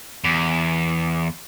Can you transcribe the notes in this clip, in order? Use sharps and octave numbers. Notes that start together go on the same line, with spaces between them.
E2